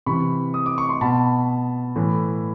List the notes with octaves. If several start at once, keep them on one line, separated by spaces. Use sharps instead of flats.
C3 E3 B5 C#6
D#6
D6
C#6
C6
B2 A5 B5
A2 E3